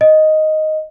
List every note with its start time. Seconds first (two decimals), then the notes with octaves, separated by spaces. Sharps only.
0.01 D#5